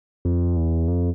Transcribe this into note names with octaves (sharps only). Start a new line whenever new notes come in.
F2
E2
F2